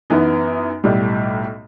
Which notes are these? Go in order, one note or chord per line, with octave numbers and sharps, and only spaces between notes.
F#2 E3 B3 D#4
B1 A2 G3